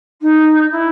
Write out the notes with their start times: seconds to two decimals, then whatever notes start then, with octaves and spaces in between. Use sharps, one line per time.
0.22 D#4
0.71 E4